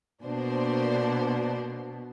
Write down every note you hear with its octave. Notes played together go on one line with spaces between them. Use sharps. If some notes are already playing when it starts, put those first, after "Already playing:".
B2 A#3 D4 C5